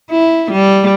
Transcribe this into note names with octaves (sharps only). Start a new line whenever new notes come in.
E4
G3